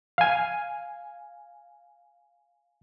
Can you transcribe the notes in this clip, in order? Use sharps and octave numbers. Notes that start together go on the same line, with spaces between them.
F5 G#5